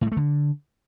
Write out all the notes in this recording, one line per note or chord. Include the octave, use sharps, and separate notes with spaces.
A2
G#3
A3
D3